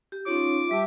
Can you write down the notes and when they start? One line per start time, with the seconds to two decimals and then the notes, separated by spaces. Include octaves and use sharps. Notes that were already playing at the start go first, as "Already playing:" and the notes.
0.12 G4
0.26 C#4 D#4 F4 C#5 D6
0.71 G3 G4 E5 A5 E6